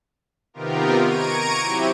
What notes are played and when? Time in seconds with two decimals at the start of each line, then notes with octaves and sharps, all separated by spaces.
0.54 C3 D#3 B3 F4 G4 A#4
1.02 A#5 C#6 G#6 D7 D#7
1.60 F#3 C4 E4 G4